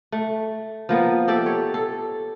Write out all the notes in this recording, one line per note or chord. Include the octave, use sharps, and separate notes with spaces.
A3
F3 A#3 B3
G4 A4 D5 E5
C#5
A4